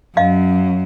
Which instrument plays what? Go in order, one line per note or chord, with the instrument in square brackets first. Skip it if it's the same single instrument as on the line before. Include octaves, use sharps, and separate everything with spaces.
[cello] F#2 [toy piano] D#5 F5